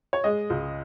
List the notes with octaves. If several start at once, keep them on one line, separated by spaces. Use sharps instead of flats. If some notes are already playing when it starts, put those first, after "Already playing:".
C#5
G#3 D#5
C#2